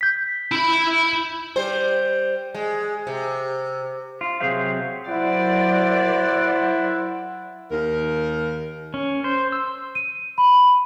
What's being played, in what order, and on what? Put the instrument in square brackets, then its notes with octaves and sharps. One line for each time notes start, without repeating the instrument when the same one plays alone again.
[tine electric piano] G6 B6
[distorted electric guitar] E4 B5
[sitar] G3 C5
G#3
C3
[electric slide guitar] F4
C3 F#3 G#4 C5 F5
[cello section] F#3 A#4 D5 [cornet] E4 [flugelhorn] C5 [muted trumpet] F#5
[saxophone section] D#2 A#4
[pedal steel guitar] C#4
C5
E6
[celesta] D#7
B5